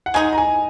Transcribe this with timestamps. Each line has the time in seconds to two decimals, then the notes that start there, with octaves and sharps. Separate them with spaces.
0.06 F#5
0.14 G#3 D#4 G#4 G#5
0.33 A#5
0.38 G#5